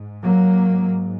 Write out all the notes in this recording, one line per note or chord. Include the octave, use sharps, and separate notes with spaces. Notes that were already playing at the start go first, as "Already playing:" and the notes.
Already playing: G#2
F#3 A#3